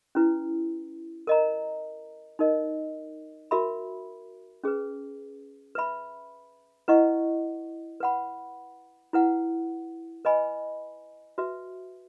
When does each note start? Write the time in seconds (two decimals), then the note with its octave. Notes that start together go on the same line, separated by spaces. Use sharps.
0.15 C#4 E4 B4
1.27 A#4 D#5 A#5
2.39 D#4 A#4 D#5
3.51 F#4 A#4 E5 B5
4.64 C#4 G#4 B4
5.75 B4 E5 B5
6.88 E4 B4 D#5 F#5 C#6
8.00 B4 F#5 B5
9.13 E4 B4 F#5
10.25 B4 D#5 G#5 B5
11.38 F#4 B4 E5